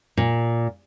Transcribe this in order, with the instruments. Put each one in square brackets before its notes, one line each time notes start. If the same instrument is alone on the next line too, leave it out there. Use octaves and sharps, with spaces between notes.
[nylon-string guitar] A#2